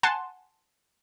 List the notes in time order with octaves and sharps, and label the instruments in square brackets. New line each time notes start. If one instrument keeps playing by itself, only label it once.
[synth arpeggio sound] F#5 G#5 A5 C6 F#6